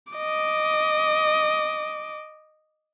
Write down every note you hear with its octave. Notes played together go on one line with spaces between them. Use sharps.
D#5 D6